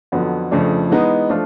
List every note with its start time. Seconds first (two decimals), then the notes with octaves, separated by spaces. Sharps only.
0.12 F2 D3 F#3 B3
0.52 F2 C#3 F3 A3 D4
0.90 E3 G#3 B3 D#4
1.29 F3 A3 D4 F4